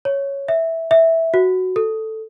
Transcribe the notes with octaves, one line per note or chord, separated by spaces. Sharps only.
C#5
E5
E5
F#4
A4